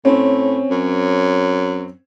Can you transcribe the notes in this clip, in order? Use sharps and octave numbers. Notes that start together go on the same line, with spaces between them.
A2 C4 C#4
F#2